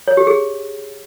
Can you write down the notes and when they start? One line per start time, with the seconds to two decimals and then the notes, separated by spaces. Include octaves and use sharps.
0.08 C#5
0.17 G4
0.27 G#4